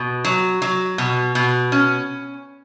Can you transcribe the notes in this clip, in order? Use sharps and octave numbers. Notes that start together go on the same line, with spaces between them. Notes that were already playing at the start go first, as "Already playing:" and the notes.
Already playing: B2
F#3
F#3
B2
B2
C#4